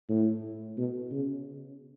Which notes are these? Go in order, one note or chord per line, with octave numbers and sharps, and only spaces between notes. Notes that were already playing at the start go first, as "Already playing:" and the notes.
A2
B2
C#3